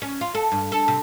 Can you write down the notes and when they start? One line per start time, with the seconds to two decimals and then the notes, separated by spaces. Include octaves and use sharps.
0.02 C#4
0.21 F4
0.35 A4
0.52 G2
0.72 A4
0.88 C3